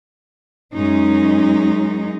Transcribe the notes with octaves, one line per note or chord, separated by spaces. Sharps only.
F#2 G#3 C#4 D#4